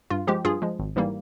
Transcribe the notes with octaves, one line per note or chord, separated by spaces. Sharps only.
G2 F4
F3 G#3 G4
G2 F4 G#4
F3 G#3
G#1
G#2 E3 G3 A#3